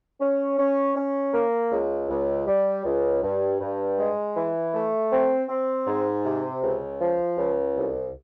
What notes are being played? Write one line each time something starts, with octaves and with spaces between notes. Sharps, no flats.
C#4
C#4
C#4
A#3
C#2
C#2
G3
C#2
G2
G2
G#3
E3
A3
C4
C4
G#2
C3
C#2
F3
C#2
C2